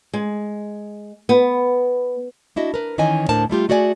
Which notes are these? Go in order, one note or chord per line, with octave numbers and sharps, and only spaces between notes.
G#3
B3
D4 E4 F#4 D#5
A#4 B4
D#3 E3 C#4 D#5 G#5
D2 A2 D4 A#4 C5 A5
G3 A3 F4 G4
A3 F#4 G#4 D5 D#5 G#5